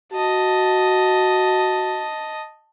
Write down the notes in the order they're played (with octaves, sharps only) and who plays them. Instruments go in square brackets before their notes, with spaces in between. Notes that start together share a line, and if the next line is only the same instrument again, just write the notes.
[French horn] F#4 [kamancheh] D#5 A5